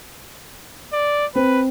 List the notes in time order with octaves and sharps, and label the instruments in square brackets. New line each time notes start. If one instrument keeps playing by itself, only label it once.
[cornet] D5
[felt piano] C4 [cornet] B4